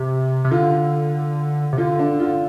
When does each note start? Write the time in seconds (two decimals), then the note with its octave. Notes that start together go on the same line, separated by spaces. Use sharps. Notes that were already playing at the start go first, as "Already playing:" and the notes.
Already playing: C3
0.45 C3
0.51 D3 F4
1.73 C3
1.77 D3 F4
1.99 D4
2.20 F4